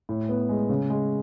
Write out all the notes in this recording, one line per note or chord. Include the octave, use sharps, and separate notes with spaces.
A2
B3
G#3
C#3
G#3